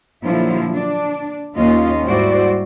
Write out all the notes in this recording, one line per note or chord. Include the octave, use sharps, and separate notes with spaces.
A#2 D3 F3 F#3 E4 F4
D4
D#2 A#3 C#4 F4 D#5
G#2 G3 E4 F#4 C5 D5